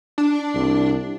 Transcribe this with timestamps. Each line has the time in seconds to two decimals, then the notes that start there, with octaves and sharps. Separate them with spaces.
0.18 D4
0.55 C2